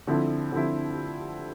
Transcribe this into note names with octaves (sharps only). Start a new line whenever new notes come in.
D3 F3 C4 E4
D3 F3 C4 E4